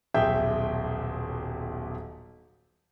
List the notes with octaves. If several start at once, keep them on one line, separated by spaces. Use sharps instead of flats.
D#1 B1 G#4 E5 G5 G6